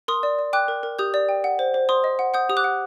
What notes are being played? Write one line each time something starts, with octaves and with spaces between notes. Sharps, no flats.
A#4 C6 D#6
D5
D5
G5 D6 F#6
A#4
A#4
G4 D#6 G6
D5
G5
F#5
C5
C5
C5 C6 D#6
D#5
F#5
F#5 D#6 G6
G4 D#6
D6 F#6
F#5